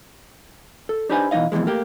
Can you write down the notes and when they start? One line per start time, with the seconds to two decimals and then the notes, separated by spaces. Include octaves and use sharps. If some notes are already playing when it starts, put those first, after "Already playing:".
0.89 A4
1.09 D4 D#4 G4 B4 C5 G#5
1.31 B2 E3 B3 D#4 D#5 F5
1.52 F2 B2 D#3 E3 G#3
1.66 A3 A#3 G4